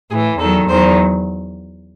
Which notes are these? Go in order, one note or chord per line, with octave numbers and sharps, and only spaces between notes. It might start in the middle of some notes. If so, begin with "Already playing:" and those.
A2 E3 G#4
E2 D#3 F#3 A4
E2 D#3 F#3 C5